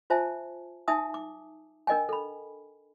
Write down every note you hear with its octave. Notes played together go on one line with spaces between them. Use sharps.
F4 C5 E5 G#5 A5
D#4 E5 G#5 A5 D#6
D6
D4 A#4 D#5 G5 G#5
A4 B5